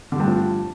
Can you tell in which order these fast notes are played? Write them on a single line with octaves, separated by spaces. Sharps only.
D3 G3 G2 A3 F3